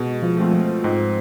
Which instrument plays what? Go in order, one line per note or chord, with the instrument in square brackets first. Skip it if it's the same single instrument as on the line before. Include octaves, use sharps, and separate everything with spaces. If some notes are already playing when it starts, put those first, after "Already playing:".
Already playing: [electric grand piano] B2 [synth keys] G#3
[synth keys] F3
[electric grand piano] A3 C4 F4
[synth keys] F3
[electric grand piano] G#2 [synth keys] C4